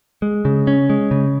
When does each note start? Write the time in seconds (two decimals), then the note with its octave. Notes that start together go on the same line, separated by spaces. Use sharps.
0.22 G#3
0.45 C#3
0.67 C#4
0.90 G#3
1.11 C#3